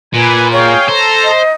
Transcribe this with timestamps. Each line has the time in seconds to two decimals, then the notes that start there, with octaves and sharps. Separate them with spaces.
0.14 A#2 B4 G#5
0.52 G#4 C#5 F5 G5
0.88 A4 C5 A#5
1.23 D#5